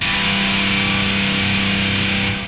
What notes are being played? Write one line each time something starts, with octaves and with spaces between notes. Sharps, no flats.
G2 E3